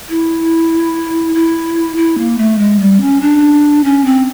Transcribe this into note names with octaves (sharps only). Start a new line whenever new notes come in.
E4
E4
E4
A#3
A3
G#3
G3
C#4
D4
C#4
C4